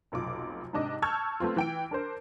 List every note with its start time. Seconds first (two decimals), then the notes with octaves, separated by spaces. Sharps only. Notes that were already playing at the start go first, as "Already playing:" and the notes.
0.12 F1 B1 F4 D6
0.73 G#2 C3 D4 D#5 D6
1.02 A5 C#6 E6 F6 G6 G#6
1.40 A3 B3 C4 F4
1.56 E3 G5 D7
1.91 D4 A#4 C5